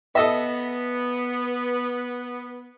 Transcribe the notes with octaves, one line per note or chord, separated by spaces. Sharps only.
B3 A4 D#5 E5